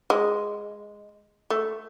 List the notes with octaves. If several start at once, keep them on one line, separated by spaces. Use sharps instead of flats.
G#3
A3